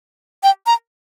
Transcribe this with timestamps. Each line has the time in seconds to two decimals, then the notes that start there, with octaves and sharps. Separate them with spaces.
0.43 G5
0.67 A#5